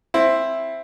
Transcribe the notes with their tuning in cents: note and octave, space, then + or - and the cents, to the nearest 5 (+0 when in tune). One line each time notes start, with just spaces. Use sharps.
C4 +10 E4 +5